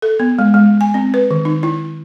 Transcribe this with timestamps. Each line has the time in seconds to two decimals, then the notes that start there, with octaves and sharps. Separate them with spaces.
0.02 A4
0.20 B3
0.39 G#3
0.54 G#3
0.81 G#5
0.94 C4
1.14 B4
1.31 D#3
1.45 D#4
1.63 E4